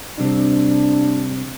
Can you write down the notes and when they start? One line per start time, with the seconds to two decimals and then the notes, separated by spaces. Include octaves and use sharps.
0.19 C3 G3 C4 D4